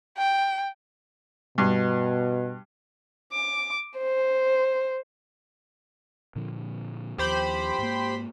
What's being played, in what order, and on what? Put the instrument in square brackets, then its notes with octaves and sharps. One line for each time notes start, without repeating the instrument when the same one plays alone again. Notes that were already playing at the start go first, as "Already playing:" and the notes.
[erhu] G5
[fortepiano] G2 [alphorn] B2
[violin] D6
C5
[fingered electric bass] A#2 D3 F3
[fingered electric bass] D#2 F3 [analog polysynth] G4 C5 B5
[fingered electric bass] G#2 A#3